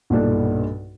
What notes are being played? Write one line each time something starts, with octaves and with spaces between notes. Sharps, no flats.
B1 G2 A#2 D4 A4